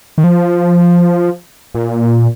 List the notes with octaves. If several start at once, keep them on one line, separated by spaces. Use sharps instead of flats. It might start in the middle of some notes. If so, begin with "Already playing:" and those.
D#3
F3
A#2